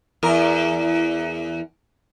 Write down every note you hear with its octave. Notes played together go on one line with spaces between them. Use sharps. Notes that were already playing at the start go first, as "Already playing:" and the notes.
E2 A#4